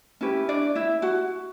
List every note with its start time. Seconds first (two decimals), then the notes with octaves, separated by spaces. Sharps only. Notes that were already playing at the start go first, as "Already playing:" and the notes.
0.21 C#4 E4 G4 B4
0.49 D4 D5
0.75 E4 E5
1.02 F#4 F#5